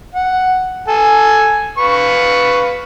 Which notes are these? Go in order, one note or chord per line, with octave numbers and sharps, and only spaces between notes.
F#5
A4 G#5
B4 F5 C#6